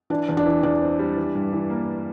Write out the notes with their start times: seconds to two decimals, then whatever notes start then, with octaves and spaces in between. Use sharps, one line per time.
0.10 E3 D4
0.29 E2
0.37 D4
0.46 E3
0.63 E2 D4
0.82 C4
0.99 G3
1.17 E3
1.35 G2
1.53 E3
1.70 A#3